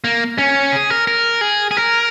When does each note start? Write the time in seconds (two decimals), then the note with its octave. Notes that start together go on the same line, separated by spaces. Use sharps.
0.04 A#3
0.38 C#4
0.72 G#4
0.90 A#4
1.07 A#4
1.41 G#4
1.71 G#4
1.77 A#4